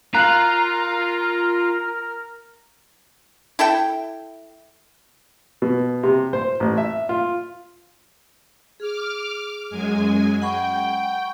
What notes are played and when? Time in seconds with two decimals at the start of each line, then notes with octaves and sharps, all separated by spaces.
0.15 F4 A#4 F5 A#5 F#6 F#7
3.59 E4 A4 E5 G5
5.62 B2
6.03 C3
6.33 C5
6.60 A1
6.78 E5
7.09 F4
8.80 G#4 D6 F6
9.70 F#2 G#3 G#5
10.42 F#5 G5 B5 C#6